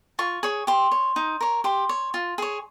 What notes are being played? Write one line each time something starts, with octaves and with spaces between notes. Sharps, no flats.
F4 C#6
G#4 C#5
G4 C6
C#5
D#4
A#4 C#5
G4 C6
C#5
F4
G#4 C#5